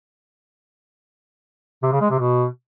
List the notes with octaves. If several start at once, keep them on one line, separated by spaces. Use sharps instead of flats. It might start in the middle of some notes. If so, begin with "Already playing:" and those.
C3
C#3
G#3
C3
B2